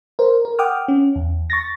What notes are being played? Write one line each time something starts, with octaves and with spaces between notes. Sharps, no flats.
A#4 C5
A#4
F#5 G5 D6 D#6 F6
C#4
E2
C#6 A6 A#6